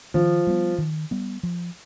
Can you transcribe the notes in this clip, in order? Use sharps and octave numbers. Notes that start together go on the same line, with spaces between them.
D#3 F3
G3 B3
D#3
G3 B3
F3